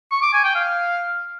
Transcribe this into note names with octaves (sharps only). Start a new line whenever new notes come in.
C#6
D6
G#5
G5
F5